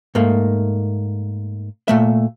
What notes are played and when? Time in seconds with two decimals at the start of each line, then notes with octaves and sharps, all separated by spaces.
0.15 G#2 A3 A#3
1.88 A#2 A3 E5